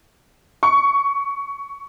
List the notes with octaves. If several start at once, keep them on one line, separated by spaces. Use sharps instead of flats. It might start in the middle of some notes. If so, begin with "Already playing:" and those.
C#6